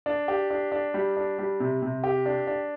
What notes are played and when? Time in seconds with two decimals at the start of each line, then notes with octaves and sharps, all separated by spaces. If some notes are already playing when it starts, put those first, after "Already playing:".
0.06 D4
0.28 G4
0.50 D4
0.72 D4
0.94 G3
1.17 D4
1.38 G3
1.60 C3
1.82 C3
2.04 G4
2.26 D4
2.47 D4